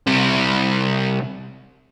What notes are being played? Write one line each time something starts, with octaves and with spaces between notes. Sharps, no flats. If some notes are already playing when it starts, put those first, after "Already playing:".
C2 C3